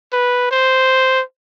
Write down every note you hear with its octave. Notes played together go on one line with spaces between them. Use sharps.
B4
C5